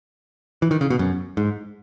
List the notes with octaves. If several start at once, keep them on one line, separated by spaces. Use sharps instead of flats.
E3
D#3
C#3
B2
F#2
G#2